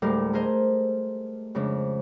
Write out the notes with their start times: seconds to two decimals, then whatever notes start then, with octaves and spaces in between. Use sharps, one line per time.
0.02 D2 A2 G3 G#3 G4 A#4
0.33 A3 G#4 A#4 C5 D#5
1.55 F2 C#3 G#3 D4